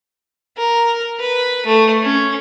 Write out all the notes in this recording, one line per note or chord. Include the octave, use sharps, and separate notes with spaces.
A#4
B4
A3
C#4